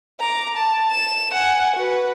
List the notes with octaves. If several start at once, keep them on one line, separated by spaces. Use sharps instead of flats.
A#5 D6
A5
E7
F#5 G#5
F#4 B4